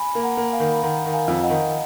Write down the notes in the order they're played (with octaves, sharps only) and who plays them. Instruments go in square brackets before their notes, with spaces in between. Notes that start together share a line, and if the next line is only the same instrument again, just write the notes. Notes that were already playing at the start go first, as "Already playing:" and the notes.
Already playing: [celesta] G#5 B5
[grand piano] A#3
[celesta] F#5 A#5
[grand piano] A#3
[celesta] F5 G#5
[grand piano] D#3
[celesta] B5
[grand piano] D#3 [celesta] F#5 A#5
[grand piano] D#3
[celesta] F5 G#5
[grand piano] F2
[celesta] D#5 F#5
[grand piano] D#3